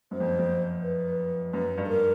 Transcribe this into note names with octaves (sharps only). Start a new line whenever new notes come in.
F#2 C5
F2
F2
B4
F#2 B4
G2
A4
A#4